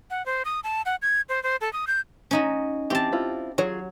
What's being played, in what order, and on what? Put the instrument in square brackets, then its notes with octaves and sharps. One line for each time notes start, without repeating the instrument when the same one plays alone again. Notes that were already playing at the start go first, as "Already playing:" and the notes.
[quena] F#5
C5
D#6
A5
F#5
G#6
C5
C5
A4
D#6
G6
[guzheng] C#4 D#4 F#4
[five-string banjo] E3 C4 [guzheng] G4 A5
[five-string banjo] C4 E4 F4
[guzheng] F#3 [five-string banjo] F4 G#4 C#5